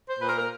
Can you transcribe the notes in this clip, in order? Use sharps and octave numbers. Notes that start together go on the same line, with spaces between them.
C5
A#2 B4
A#4
A#4